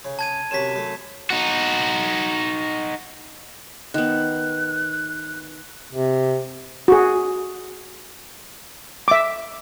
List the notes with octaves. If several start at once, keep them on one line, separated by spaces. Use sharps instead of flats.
C#3
A5 G#6 D#7
F#2 C3 F#3 B6 E7
F#2 A3
D#4 F#4
D#3 B3 F#6
C3
F#4 G#4
E5 D6